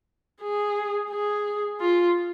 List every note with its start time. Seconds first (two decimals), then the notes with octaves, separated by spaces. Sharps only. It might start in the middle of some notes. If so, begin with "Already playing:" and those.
0.42 G#4
1.11 G#4
1.81 F4